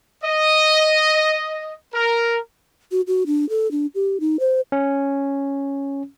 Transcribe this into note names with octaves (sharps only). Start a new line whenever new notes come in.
D#5
A#4
F#4
F#4
D4
A4
D4
G4
D#4
C5
C#4